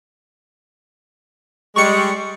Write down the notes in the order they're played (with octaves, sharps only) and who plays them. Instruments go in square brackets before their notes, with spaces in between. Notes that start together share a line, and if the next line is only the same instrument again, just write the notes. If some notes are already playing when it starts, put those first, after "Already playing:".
[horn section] G3 G#3 [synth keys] C#6 C#7